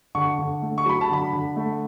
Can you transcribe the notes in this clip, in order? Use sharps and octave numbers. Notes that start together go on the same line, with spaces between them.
D3 C#6
D3
A3
C#6
F#3 B5
A5
D3 B5
D3
A3